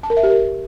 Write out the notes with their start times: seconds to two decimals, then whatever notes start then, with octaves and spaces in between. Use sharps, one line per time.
0.03 A5
0.10 A#4
0.17 E5
0.23 G4
0.30 A#4